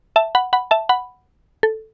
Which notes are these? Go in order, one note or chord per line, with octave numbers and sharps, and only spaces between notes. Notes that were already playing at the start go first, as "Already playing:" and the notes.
E5 A5
F#5 B5
F#5 B5
E5 A5
F#5 B5
A4